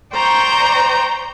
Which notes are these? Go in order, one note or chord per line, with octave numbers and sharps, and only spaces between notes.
C5 D5 G5 A#5 C#6 G6